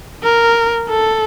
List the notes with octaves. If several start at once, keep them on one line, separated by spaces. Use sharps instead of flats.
A#4
A4